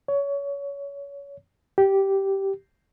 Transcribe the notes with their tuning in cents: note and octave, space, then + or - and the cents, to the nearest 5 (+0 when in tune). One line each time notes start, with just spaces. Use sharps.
C#5 +25
G4 -10